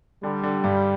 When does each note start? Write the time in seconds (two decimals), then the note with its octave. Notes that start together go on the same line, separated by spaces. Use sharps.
0.23 D3 G3
0.43 D3
0.64 G2